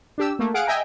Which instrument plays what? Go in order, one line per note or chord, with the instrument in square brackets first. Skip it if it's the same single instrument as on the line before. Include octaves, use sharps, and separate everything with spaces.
[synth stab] D4 G4 E6
A3 A#3
G#4 F5 F#5 D7
D#5 E5 G5 G#5 A#5